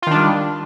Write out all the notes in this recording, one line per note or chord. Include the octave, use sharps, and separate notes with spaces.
D#3 G3 D4 F4